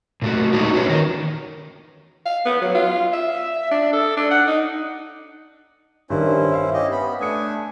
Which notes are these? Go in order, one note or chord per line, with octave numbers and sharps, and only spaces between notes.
A#2 A3 F#4
G#3 A#3 D4 D#4 F#4
C#4 F#4 G4 B4 C#5
D#3 A#4
F5
B3
F#3
F4
E5
D4
A4
D4
F#5
D#4
G2 D#3 C#4 E4 A#4 C5
E5 F5
C#4 G4 D#5
B3 B5
A3 D4 G#5 D#6 C#7